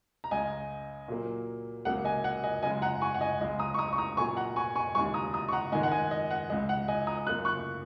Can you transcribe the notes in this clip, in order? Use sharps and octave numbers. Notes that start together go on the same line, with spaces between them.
A#5
C#2 C#3 G#3 D#5 G#5
A#2 F#3 A#3
C#2 C#3 F#3 A#3 F#5
D#5 G#5
F#5
D#5 G#5
F#2 C#3 G#3 D#5 G#5
F#5 A#5
G#5 C#6
F#5
D#5 G#5
C#2 C#3 G#3 D#5
A#5 D#6
C#6
A#5 D#6
C#6
A#5 D#6
A#2 F#3 A#3 G#5 C#6
F#5 A#5
G#5 C#6
G#5 C#6
D#2 C#3 G#3 G#5 C#6
A#5 D#6
A#5 D#6
C#6
F#5 A#5
G#2 D#3 G#3 D#5 G#5
F#5
D#5 G#5
D#5
F#5
C#2 C#3 G#3 D#5
F#5
D#5 G#5
A#5 D#6
F#2 C#3 A#3 F#6
C#6 F#6